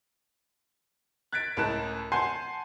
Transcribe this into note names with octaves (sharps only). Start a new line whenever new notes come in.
F#6 G#6 A6 B6 D7
C#2 A2 A#4 A5 F#6 E7
F#5 G#5 A5 C6 G6 C7